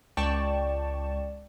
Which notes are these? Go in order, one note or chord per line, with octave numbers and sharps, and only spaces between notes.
C#2 D5 G5 A5 C#6 E7